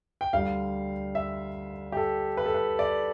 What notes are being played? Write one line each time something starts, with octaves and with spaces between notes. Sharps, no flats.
G5
D2 D3 G3 F5
E5
G4
A4
B4
A4
B4
D5